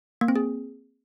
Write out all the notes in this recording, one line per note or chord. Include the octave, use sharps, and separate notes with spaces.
A#3
C4
G#4